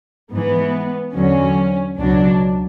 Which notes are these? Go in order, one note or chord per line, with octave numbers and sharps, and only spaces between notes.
G#2 E3 B3
E2 D3 F#3 C#4
C#2 B2 F#3 D4